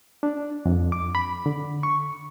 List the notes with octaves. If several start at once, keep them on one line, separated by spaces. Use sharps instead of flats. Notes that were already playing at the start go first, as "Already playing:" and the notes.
D4
F2
D6
B5
D3
C#6